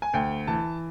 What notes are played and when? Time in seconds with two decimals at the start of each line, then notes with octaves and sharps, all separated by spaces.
0.02 G#5
0.13 D2 G5
0.47 E3 A5